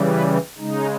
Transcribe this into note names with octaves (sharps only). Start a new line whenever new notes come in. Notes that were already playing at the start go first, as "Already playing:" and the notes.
Already playing: C#3 E3 G3
B4
C#3 G#3 D#4